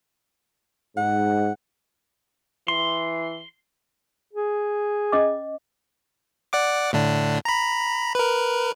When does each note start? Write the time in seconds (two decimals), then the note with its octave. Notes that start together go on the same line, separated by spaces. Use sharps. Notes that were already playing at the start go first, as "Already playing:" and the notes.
0.97 G#2 F#5
2.68 E3 C6
4.33 G#4
5.12 C#4 D#5 D6
6.53 D5 F#5 D6
6.93 A2 D3 D4
7.45 A#5 B5
8.15 A#4 B4